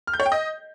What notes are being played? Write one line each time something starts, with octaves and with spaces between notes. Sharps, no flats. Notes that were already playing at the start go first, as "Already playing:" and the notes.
F6
G6
C#5
G5
D#5